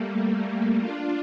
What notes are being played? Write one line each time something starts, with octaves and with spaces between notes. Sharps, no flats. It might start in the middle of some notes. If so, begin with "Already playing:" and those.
Already playing: G3 A3 A#3
A3
G3 A#3
D4 F4